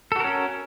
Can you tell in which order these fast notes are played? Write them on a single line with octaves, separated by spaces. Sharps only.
A4 F#4 A#4 C#4